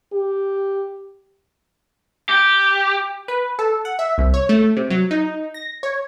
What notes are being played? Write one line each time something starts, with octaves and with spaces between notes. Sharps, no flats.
G4
G4
B4
A4
F#5
E5
C2
C#5
A3
C3
F#3
D#4
A#6
C#5